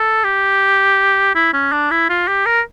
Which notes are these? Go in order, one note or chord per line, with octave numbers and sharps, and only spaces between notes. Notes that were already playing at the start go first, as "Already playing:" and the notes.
Already playing: A4
G4
E4
C#4
D4
E4
F4
G4
A#4